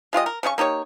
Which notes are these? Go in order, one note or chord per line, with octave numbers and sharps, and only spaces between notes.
G#3 F4 G4 D#5
A#4
C#3 C#4 D#4 C#6
A#3 D#4 G4 C#5